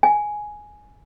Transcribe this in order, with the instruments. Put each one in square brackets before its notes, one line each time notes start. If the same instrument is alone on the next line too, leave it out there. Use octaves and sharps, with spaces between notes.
[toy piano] G#5